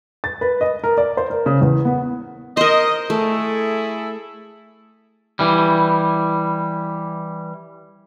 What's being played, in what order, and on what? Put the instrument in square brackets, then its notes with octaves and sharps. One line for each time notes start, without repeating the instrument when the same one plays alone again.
[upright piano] A6
B4
D#5
A#4
D5
C5
A#4
C#3
E2
B3
[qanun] A#4 C5 [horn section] D#5
[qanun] A3 [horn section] E4 G#4 A4
[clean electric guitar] E3 G3